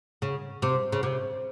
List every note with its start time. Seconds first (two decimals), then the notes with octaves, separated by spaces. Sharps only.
0.22 C#3
0.62 C3
0.92 C#3
1.03 C3